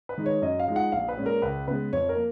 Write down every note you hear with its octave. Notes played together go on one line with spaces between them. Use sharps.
B4
D#3 G#3 D#4
C#5
F#2 D#5
F5
F3 G#3 D#4
F#5
A#1 F5
B4
A#2 G#3 C#4
A#4
C#2 B4
C#3 G#3 B3 B4
F2 C#5
A#4
A#3